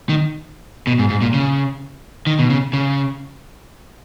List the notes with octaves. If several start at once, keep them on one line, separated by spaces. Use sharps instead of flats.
D#3
B2
G#2
G#2
A#2
C#3
D#3
B2
C#3
C#3